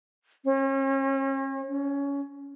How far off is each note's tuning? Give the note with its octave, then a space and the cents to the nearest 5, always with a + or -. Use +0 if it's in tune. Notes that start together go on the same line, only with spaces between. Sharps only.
C#4 -40
C#4 +20